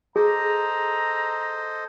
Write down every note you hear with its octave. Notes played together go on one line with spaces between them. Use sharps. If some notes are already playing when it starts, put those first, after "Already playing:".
G#4 A4 C5 D#5 A#5